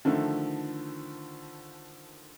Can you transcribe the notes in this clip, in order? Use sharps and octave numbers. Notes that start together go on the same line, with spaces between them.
D3 D#3 F3 A3